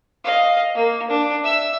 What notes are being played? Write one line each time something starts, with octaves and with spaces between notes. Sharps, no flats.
D#5 F5
A#3
D4
E5 E6